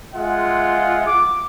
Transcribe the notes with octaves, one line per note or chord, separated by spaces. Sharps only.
G#3 F4 E5 F#5
D6